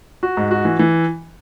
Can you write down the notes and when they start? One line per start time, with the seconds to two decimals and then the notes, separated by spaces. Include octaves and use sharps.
0.23 F#4
0.37 G#2
0.51 F#4
0.65 E3
0.79 E3